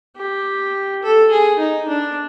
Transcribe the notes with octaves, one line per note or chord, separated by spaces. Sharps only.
G4
A4
G#4
D#4
D4